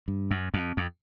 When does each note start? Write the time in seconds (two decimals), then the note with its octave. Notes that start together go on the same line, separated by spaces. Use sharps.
0.08 G2
0.31 F#2
0.54 F2
0.77 F2